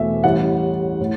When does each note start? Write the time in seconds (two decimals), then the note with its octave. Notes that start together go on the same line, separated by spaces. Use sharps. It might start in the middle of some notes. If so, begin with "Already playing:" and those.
Already playing: E2 B2 A3 E5
0.24 A1 A2 G3 F#5
1.01 A2